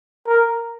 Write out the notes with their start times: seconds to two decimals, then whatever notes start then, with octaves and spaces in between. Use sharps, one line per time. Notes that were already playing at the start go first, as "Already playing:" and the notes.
0.27 A#4